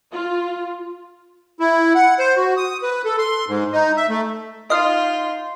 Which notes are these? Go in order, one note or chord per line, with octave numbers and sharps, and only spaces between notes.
F4
E4
F#5
C5
F#4
D#6
B4
A4
C6
G#2
D#4
E5
A3
D#4 F4 D#5 F5 C6